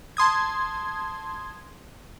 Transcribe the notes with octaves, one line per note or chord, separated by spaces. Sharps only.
A5 C6 D#6 G#6